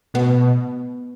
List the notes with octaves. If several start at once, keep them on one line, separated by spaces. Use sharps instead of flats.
B2 B3